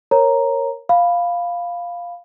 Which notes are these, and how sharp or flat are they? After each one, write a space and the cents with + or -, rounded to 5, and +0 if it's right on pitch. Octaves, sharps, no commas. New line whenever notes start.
A#4 +0 C#5 -15 A#5 +0
F5 +0 B5 +0